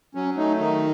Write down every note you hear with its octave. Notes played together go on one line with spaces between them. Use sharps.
F#3 C#4
A3 D#4
D#3 D#4